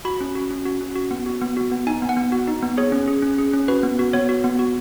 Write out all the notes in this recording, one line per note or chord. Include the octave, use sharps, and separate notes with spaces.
F#4 B5
C#4
F#4
C#4
F#4
C#4
F#4
B3
F#4
B3
F#4
B3
D#4 G#5
B3
F#5
B3
F#4
D#4
B3
G#4 C#5
C#4
G#4
C#4
G#4
C#4
F#4 B4
B3
F#4
B3 C#5
F#4
B3
F#4